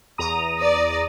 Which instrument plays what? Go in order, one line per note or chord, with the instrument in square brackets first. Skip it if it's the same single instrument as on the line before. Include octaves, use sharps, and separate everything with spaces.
[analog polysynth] E2 A#5 D#6
[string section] D5